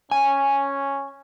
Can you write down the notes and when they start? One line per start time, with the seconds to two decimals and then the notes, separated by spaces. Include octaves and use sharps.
0.11 C#4 G#5